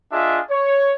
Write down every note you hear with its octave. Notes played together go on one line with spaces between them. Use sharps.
D4 F4 G#4 D#5 E5
C#5